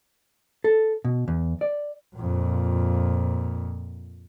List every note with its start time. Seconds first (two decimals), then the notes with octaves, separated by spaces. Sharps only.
0.64 A4
1.05 B2
1.28 E2
1.61 D5
2.16 F2 A#2